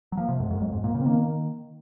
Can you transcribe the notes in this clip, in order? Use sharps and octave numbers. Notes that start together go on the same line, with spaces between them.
F#3
F3 A#3
C3
F#2 G#3
G#2
F#2 G#3
F2 F#3
G#2 G#3
A#2 A#3
C#3 A#3
C4
D#3 A#3